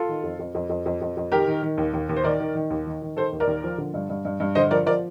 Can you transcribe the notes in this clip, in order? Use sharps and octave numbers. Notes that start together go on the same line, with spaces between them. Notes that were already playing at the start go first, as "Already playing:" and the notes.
Already playing: F4 A4
D#3
F2
F2
F2
F2
F2
F2
F2
D#3 G4 A#4
D#3
D#3
D#2
D#2
D#2
C5
D#3 A#4 D5
D#3
D#3
D#2
D#3
D#3
D#3 A4 C5
D#2
A#4 D5
D#2
F3
D3
G2
G2
G2
G2
D3 C5 D#5
F3 A#4 D5
F3 A#4 D5